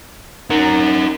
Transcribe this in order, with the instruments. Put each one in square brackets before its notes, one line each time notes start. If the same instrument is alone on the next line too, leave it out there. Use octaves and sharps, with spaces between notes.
[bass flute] D#4 [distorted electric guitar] F#4 A#4